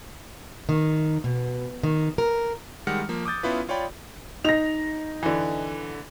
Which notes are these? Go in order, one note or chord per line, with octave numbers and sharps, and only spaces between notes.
D#3
B2
D#3
A#4
D#3 G3 G#3 F#5 F6 C#7
F3 A#3
D6 D#6 G6 A6
B3 C#4 E4 F4 B4
F4 C#5 D5 G5 B5
D#4 A#6 F7
D3 E3